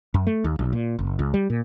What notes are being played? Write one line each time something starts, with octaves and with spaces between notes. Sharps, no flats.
F#2
A3
D#2
B1
A#2
F#1
C#2
G3
A#2